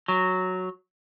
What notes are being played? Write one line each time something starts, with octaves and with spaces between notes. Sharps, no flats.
F#3